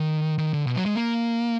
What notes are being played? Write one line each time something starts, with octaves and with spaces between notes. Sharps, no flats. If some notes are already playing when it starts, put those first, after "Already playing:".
Already playing: D#3
D#3
D3
B2
F#3
G#3
A#3